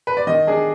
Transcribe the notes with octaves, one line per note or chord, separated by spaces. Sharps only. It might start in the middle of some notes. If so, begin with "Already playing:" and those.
B4
D5
D#3 D#5
D4 G#4